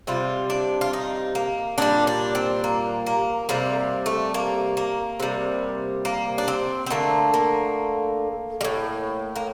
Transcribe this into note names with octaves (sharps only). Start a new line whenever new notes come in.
C3 G3 F4
D4
F4
D#4
A#3
A#2 G3 D4
D4
C4
A#3
A#3
C3 G3 A#3
A3
A#3
A#3
C3 G3
A#3
D4
C4
C4
D3 A3 A#3
A#3
G3
A2
A#3